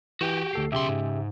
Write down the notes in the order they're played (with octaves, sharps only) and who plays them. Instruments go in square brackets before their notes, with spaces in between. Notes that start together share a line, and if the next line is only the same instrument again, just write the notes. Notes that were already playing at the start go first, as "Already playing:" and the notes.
[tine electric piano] E3 [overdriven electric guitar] F#4 G4
[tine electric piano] D2 A4 C7
[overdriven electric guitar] B1 C6 [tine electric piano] C#3 G4 E5
[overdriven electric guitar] G#2